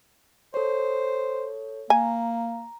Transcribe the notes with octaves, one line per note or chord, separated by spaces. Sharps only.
A4 C5 C#5
A#3 G#5 A#5